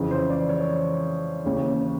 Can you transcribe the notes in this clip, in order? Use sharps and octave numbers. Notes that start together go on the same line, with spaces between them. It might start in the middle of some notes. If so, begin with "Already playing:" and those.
Already playing: F2 C#3 E3
C5
D5
C#5
D#2 C#3 E3